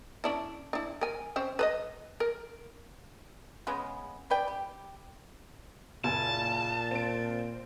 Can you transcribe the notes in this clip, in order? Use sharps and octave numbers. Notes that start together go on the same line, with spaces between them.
C#4 D4 E4
D4 E4
A#4 G#5
C4 C#4 C5
B4 C5 D#5
A#4
C#3 G#3 B3
C#3 B4 D5 G5
G4
F#1 A#2 G#5 A5
C4 D7